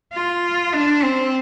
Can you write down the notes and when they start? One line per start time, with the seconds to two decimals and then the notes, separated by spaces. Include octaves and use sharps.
0.14 F4
0.73 D4
1.03 C4